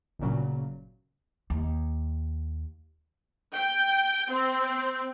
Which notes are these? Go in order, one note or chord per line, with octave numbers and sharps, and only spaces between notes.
G1 G2 A#2 C#3 F#3
D#2
G5
C4